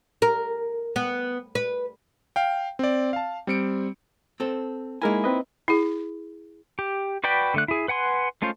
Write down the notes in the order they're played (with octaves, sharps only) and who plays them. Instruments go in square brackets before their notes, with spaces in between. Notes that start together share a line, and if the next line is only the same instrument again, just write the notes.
[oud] A#4
B3
B4
[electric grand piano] F5 G5
C4 D5
F5 A5
G3 C4 C#7 D7
[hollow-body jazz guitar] C4 A4
[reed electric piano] G#3 A#4 G#5 [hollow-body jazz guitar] A#3 D#4 E4
[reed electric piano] C4 B4 D#5
[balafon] E4 G#4
[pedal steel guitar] G4
F#4 B4 D5 G5 B5
D3 A3 F#6
E4 G#4
B4 F#5 G#5 C6
G#3 A3 C#4 F4 C5